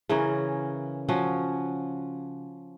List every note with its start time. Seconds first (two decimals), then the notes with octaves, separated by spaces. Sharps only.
0.09 C#3 E3 C#4 A#4
1.08 F3 C#4 F#4